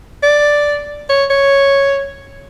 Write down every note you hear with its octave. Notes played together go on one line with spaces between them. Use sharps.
D5
C#5
C#5